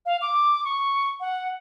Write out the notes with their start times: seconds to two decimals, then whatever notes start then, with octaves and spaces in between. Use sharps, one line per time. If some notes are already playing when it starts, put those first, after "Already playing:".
0.06 F5
0.21 D6
0.65 C#6
1.20 F#5